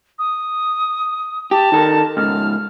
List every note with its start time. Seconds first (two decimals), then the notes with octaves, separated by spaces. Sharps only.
0.19 D#6
1.51 G4 A5
1.72 D#3 A4 A#4
2.17 C#2 G#2 F6